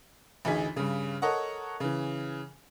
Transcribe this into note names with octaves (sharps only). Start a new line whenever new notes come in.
A1 D2 D#4 G#4 B6
G2 C#3
A4 A#4 C#5 D#5 F#5
C#3 E3